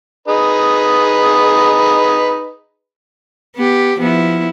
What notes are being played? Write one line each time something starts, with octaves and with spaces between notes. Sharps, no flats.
D#4 G#4 B4
B3 G4
F3 B3 E4